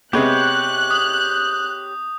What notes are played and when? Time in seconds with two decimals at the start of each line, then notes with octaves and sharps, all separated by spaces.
0.13 C3 G#3 B3 G4 C#5 F#6 G6
0.91 D#6